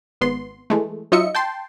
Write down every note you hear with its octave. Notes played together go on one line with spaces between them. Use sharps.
G#1 B3 C6
E3 G#3 A3
F#3 D#4 F4 D#5 E5 C#7
G5 A5 C6